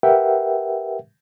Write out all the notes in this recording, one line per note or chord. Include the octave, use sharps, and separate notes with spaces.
G4 A#4 B4 E5 F#5 G5